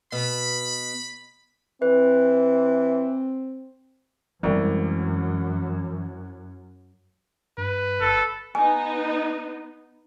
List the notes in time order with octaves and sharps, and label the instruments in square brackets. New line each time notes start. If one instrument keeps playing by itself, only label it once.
[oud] B2 [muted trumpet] B5
[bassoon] E3 [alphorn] C4 [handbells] B4
[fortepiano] C2 [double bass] F#2 [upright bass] E3 G#3
[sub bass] G2 [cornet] B4
[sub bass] G1 [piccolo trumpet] A4
[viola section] B3 D#4 [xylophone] G#5